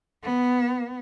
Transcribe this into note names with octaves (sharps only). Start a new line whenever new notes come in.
B3